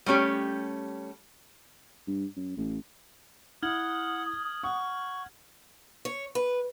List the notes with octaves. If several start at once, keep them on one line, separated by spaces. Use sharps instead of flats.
G3 A3 C#4 G4
G2
F#2
A1
E4 F#5 D#6 F6 G#6 F#7
F#5 C#6
C#5
B4